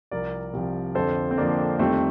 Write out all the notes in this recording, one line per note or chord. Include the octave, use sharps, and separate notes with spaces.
C2 C3 F3 A#4 D5
C2 C3 F3
F2 D3 F3 A4 C5
C4
F2 D3 F3 A#3 D4
F2 D#3 G3 A3 C4